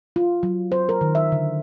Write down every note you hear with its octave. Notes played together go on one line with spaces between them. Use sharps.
F4
F#3
C5
A#4
D#3
E5
D3